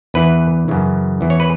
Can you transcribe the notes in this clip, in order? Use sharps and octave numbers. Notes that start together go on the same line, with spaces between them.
E2 E3 B4
F#2 C#3 E3
E2 E3
C#5
B4